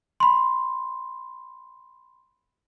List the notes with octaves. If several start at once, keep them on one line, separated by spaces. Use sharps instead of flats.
B5 C6